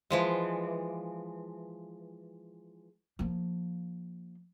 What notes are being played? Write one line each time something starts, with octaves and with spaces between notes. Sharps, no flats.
E3 F3 G#3
F3 A#3